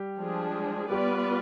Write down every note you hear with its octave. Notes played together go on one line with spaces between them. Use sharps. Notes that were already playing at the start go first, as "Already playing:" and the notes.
Already playing: G3 G4
F3 G#3 D4 G#4
G3 B3 F4 G4 B4 D5